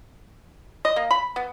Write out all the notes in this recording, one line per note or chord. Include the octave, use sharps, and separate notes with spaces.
D#5
A#3
B5
B3